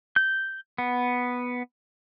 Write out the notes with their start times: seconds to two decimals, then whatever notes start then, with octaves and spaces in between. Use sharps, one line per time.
0.16 G6
0.78 B3